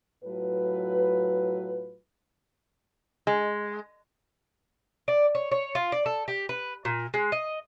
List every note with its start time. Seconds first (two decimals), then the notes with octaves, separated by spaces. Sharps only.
0.24 A2 F#3 F4 B4
3.27 G#3
5.08 D5
5.35 C#5
5.51 C#5
5.75 F4
5.92 D5
6.06 A4
6.28 G4
6.49 B4
6.85 A#2
7.14 G#3
7.32 D#5